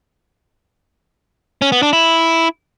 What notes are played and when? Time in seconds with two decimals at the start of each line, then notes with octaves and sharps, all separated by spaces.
1.62 C#4
1.72 B3
1.82 D4
1.93 E4